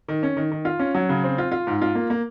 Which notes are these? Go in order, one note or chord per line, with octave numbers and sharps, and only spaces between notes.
D#3
C#4
D#3
D#3
F4
C#4
F#3
C#3
C4
F4
F4
G#2
F4
A#3
A#3